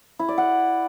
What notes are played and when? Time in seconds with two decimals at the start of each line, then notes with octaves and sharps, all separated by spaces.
0.19 E4
0.29 D5
0.38 F#5